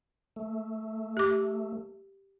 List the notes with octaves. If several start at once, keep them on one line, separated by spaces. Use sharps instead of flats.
A3
G4 D6